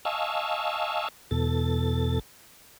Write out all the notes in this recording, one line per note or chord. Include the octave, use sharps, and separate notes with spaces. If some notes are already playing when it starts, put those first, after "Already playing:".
D#5 F5 G#5 A5 C#6 E6
E2 B2 A4 A6